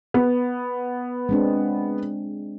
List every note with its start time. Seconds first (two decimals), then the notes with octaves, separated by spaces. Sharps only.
0.14 B3
1.29 G#3 C4 D4